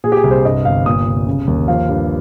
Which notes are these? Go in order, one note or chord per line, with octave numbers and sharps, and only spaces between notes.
A#2 G#4
G4
G#4
C2
C5
G2 D#5
G1 F5
A#2 D#6
C2
C#3
D#2
F3 F5
G2